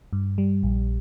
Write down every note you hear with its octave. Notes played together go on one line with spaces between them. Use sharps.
G2
G3
A#1